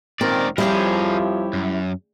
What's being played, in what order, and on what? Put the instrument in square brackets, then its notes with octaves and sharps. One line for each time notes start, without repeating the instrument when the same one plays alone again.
[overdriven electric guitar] C#2 D5 [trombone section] A#2 D#3 A#4 [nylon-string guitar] C4
[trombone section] F2 F3 [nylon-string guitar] G3 [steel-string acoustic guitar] E4 G4 C#5 [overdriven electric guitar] G#4 A#4
[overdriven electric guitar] F#2